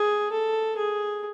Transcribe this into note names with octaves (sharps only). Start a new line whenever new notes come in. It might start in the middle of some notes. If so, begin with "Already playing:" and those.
Already playing: G#4
A4
G#4